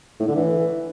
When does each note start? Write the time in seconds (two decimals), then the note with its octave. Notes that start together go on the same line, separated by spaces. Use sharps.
0.20 A2
0.28 D3
0.36 E3